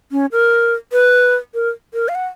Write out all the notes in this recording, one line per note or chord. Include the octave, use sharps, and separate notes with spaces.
C#4
A#4
B4
A#4
A#4
F5
F#5